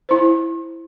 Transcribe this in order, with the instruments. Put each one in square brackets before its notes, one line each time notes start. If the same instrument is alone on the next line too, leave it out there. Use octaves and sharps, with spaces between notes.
[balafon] E4 C5